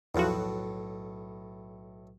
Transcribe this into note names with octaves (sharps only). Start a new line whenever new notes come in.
B1 E2 A2 F3 A3 F#4